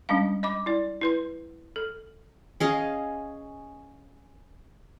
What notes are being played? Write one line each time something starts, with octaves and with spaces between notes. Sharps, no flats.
G3 G#3 C#4 D4 F5
D#5 B5 D6
E4 D5
E4 B4 C6
A4
C#4 G#4 D#5 F5